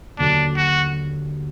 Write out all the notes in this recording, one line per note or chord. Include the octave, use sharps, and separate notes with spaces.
D#2 D3 F#3 D4
F#4